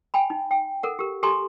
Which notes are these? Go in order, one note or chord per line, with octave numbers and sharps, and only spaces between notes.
G5 G#5 B5
D#4
G5
A4 A#4 F#5
G4 A#4
G4 A4 G#5 A#5 C6